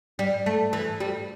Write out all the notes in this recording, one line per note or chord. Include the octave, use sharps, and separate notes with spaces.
G3
A3
E3
G3